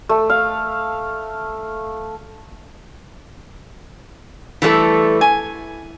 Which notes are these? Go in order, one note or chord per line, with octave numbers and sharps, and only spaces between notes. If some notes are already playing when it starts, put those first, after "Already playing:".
A3
F5
E3 G3 A3 D#4 A4
G#5